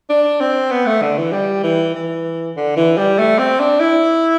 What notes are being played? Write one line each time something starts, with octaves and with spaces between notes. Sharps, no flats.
D4
C4
B3
A3
D3
E3
G3
E3
E3
D3
E3
G3
A3
C4
D4
E4